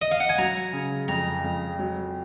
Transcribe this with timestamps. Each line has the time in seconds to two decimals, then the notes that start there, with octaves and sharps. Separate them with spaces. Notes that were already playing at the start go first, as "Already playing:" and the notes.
0.02 D#5
0.11 F5
0.20 F#5
0.29 G#5
0.38 F#3 A#5
0.73 C#3
1.08 F2 A#5
1.44 F2
1.79 F#3